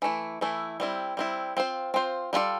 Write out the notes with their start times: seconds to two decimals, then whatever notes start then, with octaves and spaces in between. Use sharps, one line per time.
0.02 E3 A3 E4
0.41 E3 A3 E4
0.80 G3 C4 E4
1.17 G3 C4 E4
1.57 C4 F4 C5
1.94 C4 F4 C5
2.33 G3 D4 F4 A4 D5